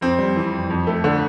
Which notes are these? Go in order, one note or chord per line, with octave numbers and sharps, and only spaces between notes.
F2 C4
G3
E3
F2
F2
A3
D3